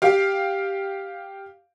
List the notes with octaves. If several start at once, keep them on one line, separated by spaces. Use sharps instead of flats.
G4 F5